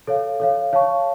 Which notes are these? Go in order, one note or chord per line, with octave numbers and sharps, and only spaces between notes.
A4 C#5 F5
A4 C#5 F5
C#5 F5 A5 C#6